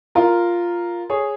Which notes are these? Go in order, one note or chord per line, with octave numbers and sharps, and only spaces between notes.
F4 A#4
G#4 C#5